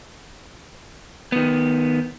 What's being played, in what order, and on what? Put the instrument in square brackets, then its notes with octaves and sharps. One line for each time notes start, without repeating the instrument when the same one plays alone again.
[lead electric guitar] D#3 B3